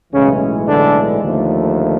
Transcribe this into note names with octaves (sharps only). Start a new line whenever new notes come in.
B1 A2 C#3 E3 G#3 C#4
D3 D4
D#2 D3 F3 A3